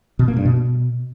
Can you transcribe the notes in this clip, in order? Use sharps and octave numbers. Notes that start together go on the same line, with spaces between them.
B2
A#3
G2
B2